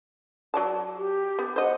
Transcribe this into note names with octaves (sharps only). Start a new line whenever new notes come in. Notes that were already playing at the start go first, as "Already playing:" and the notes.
F#3 D5 A5
G4
B3
C5 D#5 F#5